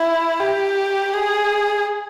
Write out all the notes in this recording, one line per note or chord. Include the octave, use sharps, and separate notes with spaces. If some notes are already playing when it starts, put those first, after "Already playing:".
Already playing: E4
G4
G#4